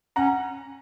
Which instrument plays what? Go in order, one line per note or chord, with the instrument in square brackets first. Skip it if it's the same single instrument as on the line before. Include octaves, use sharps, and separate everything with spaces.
[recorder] C#4 [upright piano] F#5 A#5